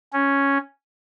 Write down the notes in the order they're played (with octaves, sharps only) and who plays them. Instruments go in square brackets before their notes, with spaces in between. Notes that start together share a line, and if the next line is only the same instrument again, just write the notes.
[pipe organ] C#4